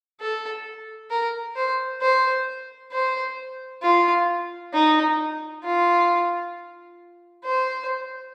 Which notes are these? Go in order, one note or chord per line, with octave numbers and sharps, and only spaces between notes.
A4
A#4
C5
C5
C5
F4
D#4
F4
C5